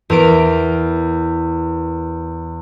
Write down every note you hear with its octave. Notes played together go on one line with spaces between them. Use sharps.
E2 A#4 D7